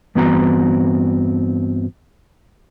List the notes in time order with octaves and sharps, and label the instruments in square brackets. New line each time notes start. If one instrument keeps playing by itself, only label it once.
[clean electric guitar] G2 E3 B3 C4 F#4 A#5